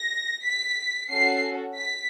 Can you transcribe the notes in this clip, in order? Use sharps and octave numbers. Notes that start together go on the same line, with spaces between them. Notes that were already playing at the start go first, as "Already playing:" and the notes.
Already playing: A#6
B6
C#4 F#4 A4 C7
B6